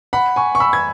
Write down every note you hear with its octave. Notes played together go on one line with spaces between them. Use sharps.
F#5 B5
G#5 C#6
C#6
B5 E6
G#6